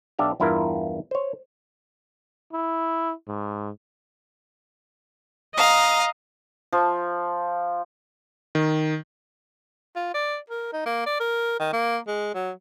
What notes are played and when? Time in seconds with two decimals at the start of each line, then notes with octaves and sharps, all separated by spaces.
0.19 B1 D4 G4 E5 F5
0.40 E2 G2 E4 F4 A#4
1.11 C5 C#5
2.53 E4
3.27 G#2
5.56 D#5 F5 A#5
6.73 F3
8.55 D#3
9.96 F4
10.14 D5
10.50 A#4
10.73 D#4
10.86 A#3
11.06 D5
11.20 A#4
11.60 D#3
11.73 A#3
12.07 G#3
12.35 F#3